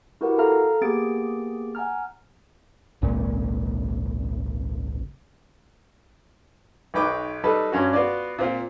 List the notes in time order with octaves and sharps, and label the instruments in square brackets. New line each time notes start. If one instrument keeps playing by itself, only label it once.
[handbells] E4 F#4 G4 A#4 B4 F#5
A4 F5 A#5 F6
A#3 B3 G4 G#4 A6 D7
F#5 G#5 A#5 F6
[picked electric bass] G#1 C#2 A#2
[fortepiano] B1 D#4 B4 G5 D6
G3 D#4 A4 B4
G2 C#4 F#4
B3 F4 F#4 D5
A#2 C4 F4